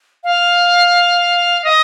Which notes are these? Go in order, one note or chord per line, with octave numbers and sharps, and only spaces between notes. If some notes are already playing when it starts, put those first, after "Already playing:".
F5
D#5